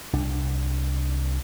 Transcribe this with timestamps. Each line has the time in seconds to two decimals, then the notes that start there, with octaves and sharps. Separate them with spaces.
0.13 C2 D4